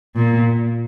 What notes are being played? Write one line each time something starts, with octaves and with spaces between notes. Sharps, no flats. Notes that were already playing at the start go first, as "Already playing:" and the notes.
A#2